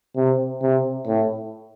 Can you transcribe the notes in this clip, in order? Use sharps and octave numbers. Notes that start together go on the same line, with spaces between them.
C3
C3
A2